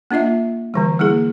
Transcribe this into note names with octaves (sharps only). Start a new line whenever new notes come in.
A#3 D4 F4 D#5 E5
D3 E3 G3
G3 A#3 E4 G#4